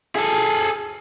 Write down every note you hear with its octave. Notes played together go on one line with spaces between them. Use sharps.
G#4 A4